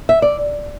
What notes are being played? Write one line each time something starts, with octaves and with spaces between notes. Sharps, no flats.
E5
D5